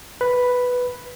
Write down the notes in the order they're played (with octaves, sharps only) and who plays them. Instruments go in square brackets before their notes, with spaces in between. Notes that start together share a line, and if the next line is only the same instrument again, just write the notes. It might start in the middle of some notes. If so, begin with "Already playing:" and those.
[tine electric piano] B4